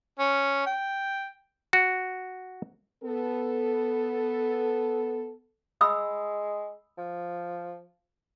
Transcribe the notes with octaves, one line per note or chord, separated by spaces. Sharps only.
C#4
G5
F#4
B3 A4
G#3 B5 D#6 E6
F3